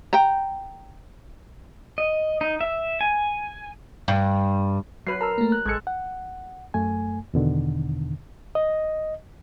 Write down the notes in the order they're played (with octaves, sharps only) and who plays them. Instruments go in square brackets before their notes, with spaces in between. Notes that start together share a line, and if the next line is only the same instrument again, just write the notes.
[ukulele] G5 A#5
[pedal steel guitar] D#5
D#4
E5
G#5
[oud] G2
[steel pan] F#3 B4 [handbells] C7
[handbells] A#4 A#5 [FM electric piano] A5 E6
[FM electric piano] A3 A#3
[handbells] F#6
[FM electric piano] A1 G#6 C#7 [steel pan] G#3 A4
[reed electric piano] F#5
F#2 A3 G#5
E2 B2 D3 D#3
D#5